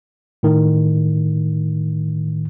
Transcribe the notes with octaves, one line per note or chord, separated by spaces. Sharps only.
A2 D#3